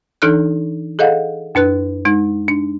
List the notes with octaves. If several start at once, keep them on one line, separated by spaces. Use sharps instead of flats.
E3 D4 D#4 A4 F6 F#6
G#4 A4 D#5 F5 F#5
F#2 D4 B4 F#6
G#3 D#4
D4